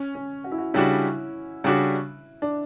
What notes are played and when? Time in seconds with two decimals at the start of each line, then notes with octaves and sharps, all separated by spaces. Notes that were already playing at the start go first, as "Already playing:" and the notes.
Already playing: C#4
0.15 C#4
0.44 F#4
0.52 E4
0.58 F#4
0.74 C#3 G3 D4 E4 F#4
1.64 C#3 G3 D4 F#4
2.42 D4